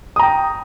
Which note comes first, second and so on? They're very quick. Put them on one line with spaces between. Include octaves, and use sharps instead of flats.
D#6 A#5 G5